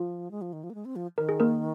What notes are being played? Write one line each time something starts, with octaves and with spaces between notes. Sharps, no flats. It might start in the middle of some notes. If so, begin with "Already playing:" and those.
Already playing: F3 F4
G#3
F3
D#3
F3
A#3
G#3
C4
F3
D#3 A#4
G#4
A#3 A#4